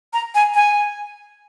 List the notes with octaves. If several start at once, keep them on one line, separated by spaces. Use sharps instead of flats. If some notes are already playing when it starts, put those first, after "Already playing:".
A#5
G#5
G#5